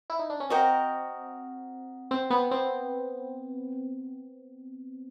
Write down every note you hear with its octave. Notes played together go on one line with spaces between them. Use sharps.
E4
D#4
D4
C#4
C4 F#4 A#4 D#5 G5
C4
B3
C4